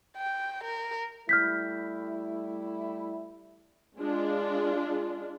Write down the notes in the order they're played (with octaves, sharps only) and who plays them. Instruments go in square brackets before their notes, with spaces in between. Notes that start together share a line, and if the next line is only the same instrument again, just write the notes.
[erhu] G5
A#4
[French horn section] G3 A3 E4 [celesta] F6 G6 B6
[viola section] G#3 D4 F4